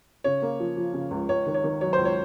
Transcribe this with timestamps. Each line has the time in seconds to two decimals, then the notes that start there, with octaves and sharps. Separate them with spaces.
0.24 C#3 C#5
0.42 A#3
0.60 F3
0.77 F3
0.94 C#3
1.11 C#2
1.29 C#2 C#5
1.47 D#3
1.54 C#5
1.64 D#3
1.81 F#3 C#5
1.93 C5
1.98 C#2
2.05 C#5